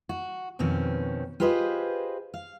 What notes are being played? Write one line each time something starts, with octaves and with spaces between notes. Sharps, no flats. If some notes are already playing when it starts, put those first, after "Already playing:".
F#4
F2 B2 D#3 C4 C#4
F4 G4 G#4 B4 C5 D#5
F5